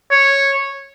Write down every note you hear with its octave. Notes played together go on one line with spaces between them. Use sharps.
C#5